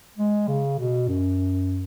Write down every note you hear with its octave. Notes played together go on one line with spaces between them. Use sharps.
G#3
C#3
B2
F#2